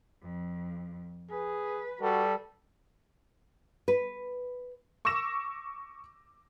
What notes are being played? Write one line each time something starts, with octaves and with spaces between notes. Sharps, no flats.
F2
G#4 B4
G3 F#4 A4
B4
C#6 D6 E6 A#6 E7